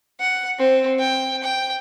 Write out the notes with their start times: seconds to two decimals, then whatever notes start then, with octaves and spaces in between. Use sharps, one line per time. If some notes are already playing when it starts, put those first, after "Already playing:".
0.20 F#5
0.59 C4
0.99 G5
1.43 G5